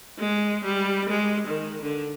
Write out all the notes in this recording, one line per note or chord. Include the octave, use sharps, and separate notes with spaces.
G#3
G3
G#3
D#3
D3